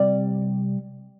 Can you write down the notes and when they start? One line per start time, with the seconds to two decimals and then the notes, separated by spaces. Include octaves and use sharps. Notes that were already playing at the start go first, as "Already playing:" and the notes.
Already playing: C3 G3 D5